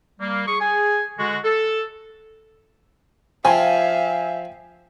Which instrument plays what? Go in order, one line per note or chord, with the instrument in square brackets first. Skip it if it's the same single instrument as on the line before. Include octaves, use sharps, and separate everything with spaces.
[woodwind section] G3 A#3
G#4 C#6
G#4 G#5
D3 G#3 F#4
A4
[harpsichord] F3 [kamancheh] E5 F5 [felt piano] G5 G#5